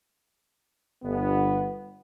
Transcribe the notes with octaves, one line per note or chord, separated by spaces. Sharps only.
G1 B3